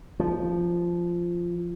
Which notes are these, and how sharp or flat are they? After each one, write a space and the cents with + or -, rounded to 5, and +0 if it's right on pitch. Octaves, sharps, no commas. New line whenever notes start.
F3 -10